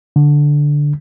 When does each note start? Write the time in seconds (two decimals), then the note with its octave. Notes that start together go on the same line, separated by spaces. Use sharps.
0.16 D3